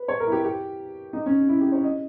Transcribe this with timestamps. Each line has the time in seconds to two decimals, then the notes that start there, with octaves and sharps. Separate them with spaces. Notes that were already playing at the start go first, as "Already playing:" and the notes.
Already playing: B4
0.08 C#5
0.20 A#4
0.27 E4
0.32 G4
0.44 G4
1.13 D#4
1.26 C#4
1.49 E4
1.60 G4
1.72 C#5
1.84 D#5